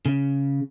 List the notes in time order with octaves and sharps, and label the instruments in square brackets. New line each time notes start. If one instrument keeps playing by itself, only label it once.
[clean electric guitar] C#3